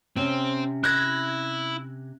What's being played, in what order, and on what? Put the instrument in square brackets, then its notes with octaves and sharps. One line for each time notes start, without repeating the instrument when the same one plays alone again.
[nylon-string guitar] C3 C#4 [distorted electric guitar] C4
[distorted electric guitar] E4 [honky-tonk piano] F#6 G#6 A#6